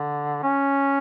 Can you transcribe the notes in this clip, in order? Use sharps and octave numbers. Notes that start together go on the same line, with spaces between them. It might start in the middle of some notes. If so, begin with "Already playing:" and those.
Already playing: D3
C#4